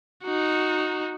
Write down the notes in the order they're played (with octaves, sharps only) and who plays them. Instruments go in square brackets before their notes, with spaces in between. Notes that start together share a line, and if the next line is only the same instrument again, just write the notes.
[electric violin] D#4 F#4